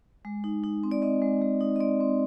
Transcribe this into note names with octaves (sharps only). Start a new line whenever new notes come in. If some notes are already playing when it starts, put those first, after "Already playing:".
G#3
D#4
D#4
C4
D5
C4 D#5
G#3
G#3
D#4
D#5
C4 D5
C4